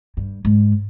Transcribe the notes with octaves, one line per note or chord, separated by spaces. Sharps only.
G2
G#2